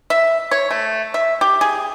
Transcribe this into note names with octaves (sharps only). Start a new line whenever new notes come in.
E5
C#5
A3
E5
G4
G#4